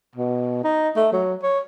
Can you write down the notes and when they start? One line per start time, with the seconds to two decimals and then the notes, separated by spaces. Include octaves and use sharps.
0.15 B2
0.64 D#4
0.96 A3
1.13 F#3
1.43 C#5